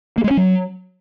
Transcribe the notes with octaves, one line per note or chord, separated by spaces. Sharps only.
A#3
G#3
C#4
F#3